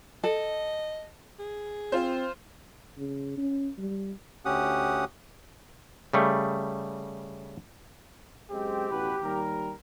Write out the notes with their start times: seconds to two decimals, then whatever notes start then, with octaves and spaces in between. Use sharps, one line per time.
0.24 A4 D#5
1.39 G#4
1.92 C4 F4 C5
2.98 C#3
3.37 C#4
3.78 G3
4.45 D2 C#4 G4 F#5 D#6
6.13 C#3 G3 A3
8.51 F#2 G#3 C4 G4
8.90 A1 B2 B4
9.22 D#2 G3 A#4